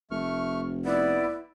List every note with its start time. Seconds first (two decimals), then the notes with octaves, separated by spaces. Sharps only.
0.11 F1 A3 C#6 F6
0.85 B3 E4 D5